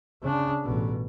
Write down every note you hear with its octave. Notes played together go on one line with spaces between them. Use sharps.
C#3 D4
A1 B2